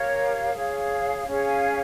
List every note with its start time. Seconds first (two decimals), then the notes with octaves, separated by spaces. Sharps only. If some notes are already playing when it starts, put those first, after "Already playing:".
Already playing: G4 A#4 C#5 F5
0.54 G#4 C#5 F5
1.26 C#4 G#4 C#5 F5